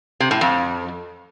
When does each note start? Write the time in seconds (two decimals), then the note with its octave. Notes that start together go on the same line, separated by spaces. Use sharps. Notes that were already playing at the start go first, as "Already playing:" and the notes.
0.20 C3
0.31 A2
0.41 F2